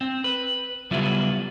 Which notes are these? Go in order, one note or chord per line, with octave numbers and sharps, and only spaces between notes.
C4
B4
C#3 F#3 G3 B3 E4 F4